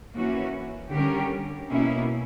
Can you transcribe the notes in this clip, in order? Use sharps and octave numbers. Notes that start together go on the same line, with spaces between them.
E3 A#3 C#4 F#4
D3 G3 C#4 G4 A#4
B2 A#3 C#4 E4